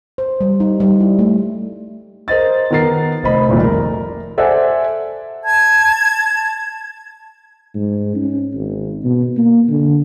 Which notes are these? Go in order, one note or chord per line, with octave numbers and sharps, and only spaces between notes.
C5
G3
D#4
G3
E4
A3
A#4 C5 D#5 A6
D#3 B3 A#4 A6 C7
F1 C5 D#5 B5
C2 F2 A#2 D#3 A3
A#4
A4 C5 D5 E5 F#5 G#5
A5 G#6
G#2
C#4
G#1
B2
A#3
D3